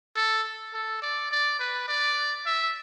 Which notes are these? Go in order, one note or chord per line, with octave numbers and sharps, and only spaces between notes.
A4
A4
D5
D5
B4
D5
E5